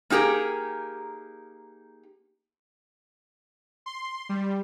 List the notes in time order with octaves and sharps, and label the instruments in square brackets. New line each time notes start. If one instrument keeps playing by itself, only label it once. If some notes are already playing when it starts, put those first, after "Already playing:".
[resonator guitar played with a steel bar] A#3 D#4 G4 G#4 A#4
[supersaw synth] C6
G3